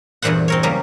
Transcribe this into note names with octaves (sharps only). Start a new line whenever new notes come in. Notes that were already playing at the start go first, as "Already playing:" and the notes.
E2 G2 A#2 E3 C5 F#5
C4 A#4 C#5
C#3 F#3 G3 A#3